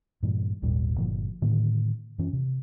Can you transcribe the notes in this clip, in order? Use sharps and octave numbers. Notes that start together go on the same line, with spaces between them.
G2 A#2 E3
G#1 D#2 A#2 G3
G1 A#2 F3
A2 D3 D#3 A#3
F#2 E3 C#4
C3